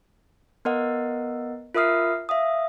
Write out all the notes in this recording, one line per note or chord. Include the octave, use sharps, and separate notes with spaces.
B3 A#4 D#5 F#5
F4 A#4 E5 D#6 F6 C7
E5 F5 D#6